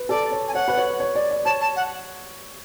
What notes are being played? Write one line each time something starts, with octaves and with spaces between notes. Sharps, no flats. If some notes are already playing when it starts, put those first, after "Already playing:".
Already playing: B4
A4 D5
C#5
G#5
C#5 F#5
B4
C#5
C#5
D5
D5
C#5 A5
A5
F#5